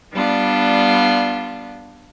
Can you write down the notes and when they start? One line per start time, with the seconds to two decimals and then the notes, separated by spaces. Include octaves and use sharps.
0.12 G3 B3 D4 F4